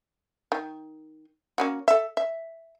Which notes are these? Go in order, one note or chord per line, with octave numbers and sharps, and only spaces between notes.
D#3
A#3 C#4 F#4
A4 E5
E5